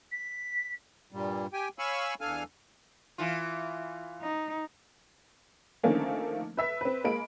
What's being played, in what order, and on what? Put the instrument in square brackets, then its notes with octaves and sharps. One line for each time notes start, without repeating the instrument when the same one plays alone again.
[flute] B6
[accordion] G2 A#2 G3
G4 G5 G#5
C#5 F5 G#5 B5 C#6 E6
E2 D4 A4 F5 G#5 F6
[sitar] E3 F4
[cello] D#4
[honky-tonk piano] D3 D#3 F3 A3 A#3 C#4
B4 E5 B6
C4 B4
G#3 A#3 B5 D7